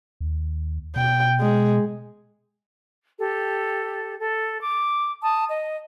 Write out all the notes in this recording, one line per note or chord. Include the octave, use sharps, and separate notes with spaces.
D#2
B2 G5
G#3
G4 A4
A4
D6
A5 D#6
D#5